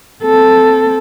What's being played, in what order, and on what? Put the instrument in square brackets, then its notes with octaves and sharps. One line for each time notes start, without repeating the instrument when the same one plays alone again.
[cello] C4 A4